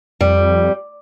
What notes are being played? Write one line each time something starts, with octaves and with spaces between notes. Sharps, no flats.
F2 G3